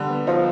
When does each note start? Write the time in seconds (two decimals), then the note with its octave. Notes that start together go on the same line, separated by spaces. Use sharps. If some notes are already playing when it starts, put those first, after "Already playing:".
Already playing: D3 G3
0.09 B3
0.27 F3 D#4